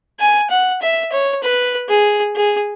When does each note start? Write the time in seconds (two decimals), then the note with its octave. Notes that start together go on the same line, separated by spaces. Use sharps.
0.20 G#5
0.50 F#5
0.82 E5
1.12 C#5
1.43 B4
1.89 G#4
2.36 G#4